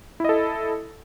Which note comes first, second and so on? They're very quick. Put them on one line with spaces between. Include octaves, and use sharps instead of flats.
E4 D#5 A4